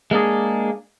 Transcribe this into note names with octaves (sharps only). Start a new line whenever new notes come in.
G#3 A#3 D4 G#4